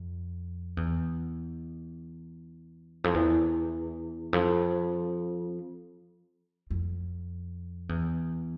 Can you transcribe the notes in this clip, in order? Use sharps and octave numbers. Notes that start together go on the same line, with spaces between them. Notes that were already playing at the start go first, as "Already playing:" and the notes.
Already playing: F2
E2
F2
E2
F2
F2
E2